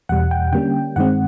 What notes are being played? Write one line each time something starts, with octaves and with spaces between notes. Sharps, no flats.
E2 B2 G3 F#5
G5
D3 G3 A#3 C#4 G5
G2 D#3 G#3 C4 F#5